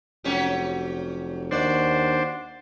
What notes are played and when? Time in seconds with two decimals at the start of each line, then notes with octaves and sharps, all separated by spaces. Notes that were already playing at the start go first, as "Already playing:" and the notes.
0.24 F1 F#3 C#4 G4
1.51 D#2 D4 F#4 C5 D5